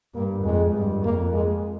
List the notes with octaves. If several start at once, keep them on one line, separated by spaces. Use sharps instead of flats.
G2 A#3
F2 G#3
G2
F2 A#3
G#3